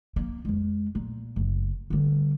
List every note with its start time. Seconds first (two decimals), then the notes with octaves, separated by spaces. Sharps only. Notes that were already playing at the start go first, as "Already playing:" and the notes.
0.16 A#3
0.45 F2 G#3
0.95 A#2
1.36 F#1
1.90 D3 G3